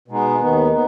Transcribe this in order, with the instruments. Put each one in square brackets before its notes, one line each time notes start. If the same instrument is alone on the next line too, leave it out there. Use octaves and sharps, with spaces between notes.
[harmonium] B2 G#3 B3 D#4
D#2 D#3 B3 D#4
B3 D#4